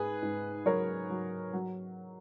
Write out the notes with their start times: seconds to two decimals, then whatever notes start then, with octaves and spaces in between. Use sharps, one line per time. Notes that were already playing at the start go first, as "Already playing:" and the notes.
Already playing: G#2 G#4 B4
0.22 G#2
0.66 F#3 A#4 C#5
1.10 F#3
1.53 F#3